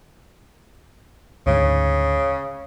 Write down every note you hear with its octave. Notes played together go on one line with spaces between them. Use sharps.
D2 G#2 C#3